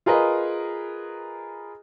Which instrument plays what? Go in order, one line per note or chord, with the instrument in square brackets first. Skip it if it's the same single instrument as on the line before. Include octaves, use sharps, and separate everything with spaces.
[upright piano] F4 G#4 A#4 B4 D#5